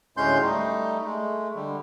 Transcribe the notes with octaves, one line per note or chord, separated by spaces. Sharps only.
D2 A2 G#3 C#4 C6 G6
G3 A3 D#4
G#3 A3
D3 G3